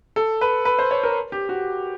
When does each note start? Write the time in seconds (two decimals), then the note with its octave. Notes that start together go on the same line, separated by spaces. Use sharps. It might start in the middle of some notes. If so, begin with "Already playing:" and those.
0.16 A4
0.41 B4
0.65 B4
0.79 C5
0.91 C#5
1.03 A#4
1.32 G4
1.49 F#4